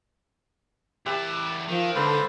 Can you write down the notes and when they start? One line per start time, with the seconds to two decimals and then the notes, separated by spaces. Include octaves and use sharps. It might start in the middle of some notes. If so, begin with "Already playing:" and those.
1.06 E2 G4 B4 E5 A5
1.68 D#3 F3
1.95 G#2 D3 A#3 A4 B4 C5